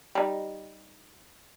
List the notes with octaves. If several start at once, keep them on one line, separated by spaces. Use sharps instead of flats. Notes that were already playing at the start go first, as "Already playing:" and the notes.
G3 D#4